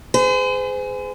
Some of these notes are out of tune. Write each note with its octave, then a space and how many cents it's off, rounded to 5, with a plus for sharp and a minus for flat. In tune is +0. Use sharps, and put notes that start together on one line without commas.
G#4 +0 C5 -45